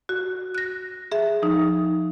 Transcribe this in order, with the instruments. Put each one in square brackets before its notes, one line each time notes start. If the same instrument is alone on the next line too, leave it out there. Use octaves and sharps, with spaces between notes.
[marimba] F#4
F#6 A#6
G#4 E5
F3 D#4